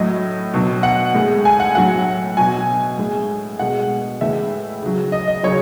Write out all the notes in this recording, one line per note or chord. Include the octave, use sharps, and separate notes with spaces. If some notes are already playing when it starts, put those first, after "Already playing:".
Already playing: A2 F#3 D#5
B2 F#3
F#5
A2 G#3
G#5
F#5
A2 F#3 F#5
B2 F#3 G#5
A2 G#3
B2 G#3 F#5
A2 E3 G#3 E5
C#3 F#3
D#5
D#5
C#3 F#3 C#5